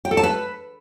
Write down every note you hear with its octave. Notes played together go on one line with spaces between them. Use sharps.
G5
A4
A5
B4